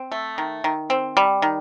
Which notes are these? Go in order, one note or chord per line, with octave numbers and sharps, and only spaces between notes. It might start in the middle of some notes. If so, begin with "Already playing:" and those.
Already playing: C4
A3
D#3
D#3
C4
G3
D#3